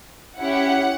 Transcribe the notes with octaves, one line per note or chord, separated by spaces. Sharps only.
C#4 E4 G4 F#5